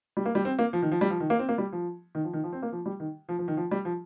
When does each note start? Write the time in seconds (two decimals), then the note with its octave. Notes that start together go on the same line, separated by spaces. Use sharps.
0.17 G3
0.25 A#3
0.35 G3
0.45 C4
0.59 A#3
0.73 F3
0.82 D#3
0.92 F3
1.01 G3
1.10 F3
1.20 D#3
1.30 A#3
1.39 C4
1.49 A#3
1.58 G3
1.72 F3
2.15 D#3
2.24 F3
2.33 D#3
2.44 F3
2.52 C4
2.62 A#3
2.72 F3
2.86 G3
3.00 D#3
3.29 F3
3.39 F3
3.48 D#3
3.57 F3
3.71 G3
3.85 F3